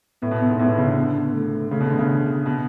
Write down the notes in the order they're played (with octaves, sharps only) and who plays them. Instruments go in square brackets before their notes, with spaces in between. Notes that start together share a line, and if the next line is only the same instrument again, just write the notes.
[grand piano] A2 [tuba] B3
[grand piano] B2
B2
G#2
[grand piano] A2 [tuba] B3
[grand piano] B2
C#3
D3
[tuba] B3
A3
[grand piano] C#3 [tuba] A3
[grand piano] B2
D3
C#3
B2